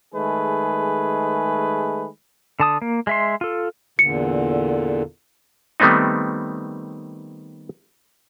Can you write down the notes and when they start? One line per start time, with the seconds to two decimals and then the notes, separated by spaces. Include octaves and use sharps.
0.14 D#3 G#3 A3 G#4 B4
2.60 D3 A5 D#6
2.82 A#3
3.07 G#3 E5 C6
3.41 F4 A4
3.99 E2 A#2 D3 C#7
5.80 D#3 G3 A3 B3 C4 D#4